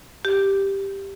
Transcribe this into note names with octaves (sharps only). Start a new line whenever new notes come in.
G4